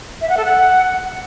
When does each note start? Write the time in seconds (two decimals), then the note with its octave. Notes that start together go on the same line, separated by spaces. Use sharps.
0.21 E5
0.29 F#5
0.37 A4
0.45 F#5